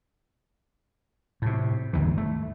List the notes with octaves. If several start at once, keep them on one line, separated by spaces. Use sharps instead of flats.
A2 C3
G1 D#2 G#2 E3
A3